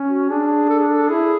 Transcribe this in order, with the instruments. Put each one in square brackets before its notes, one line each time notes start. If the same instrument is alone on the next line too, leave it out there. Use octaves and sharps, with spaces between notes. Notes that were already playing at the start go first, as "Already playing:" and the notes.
Already playing: [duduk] C#4
[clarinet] F#4
[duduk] D4 [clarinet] G#4
[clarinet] A4
G#4
A4
[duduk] E4 [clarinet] G#4